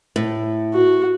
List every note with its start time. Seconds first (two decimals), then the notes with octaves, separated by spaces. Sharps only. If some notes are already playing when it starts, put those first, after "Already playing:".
0.16 A2
0.74 F#4